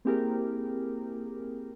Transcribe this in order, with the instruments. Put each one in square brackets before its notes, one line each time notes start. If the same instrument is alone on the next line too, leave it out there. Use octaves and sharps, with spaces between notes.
[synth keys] A#3 C4 E4 G4 G#4 A#4